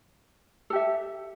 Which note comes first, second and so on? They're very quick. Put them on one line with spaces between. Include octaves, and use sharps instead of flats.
A4 G4 E5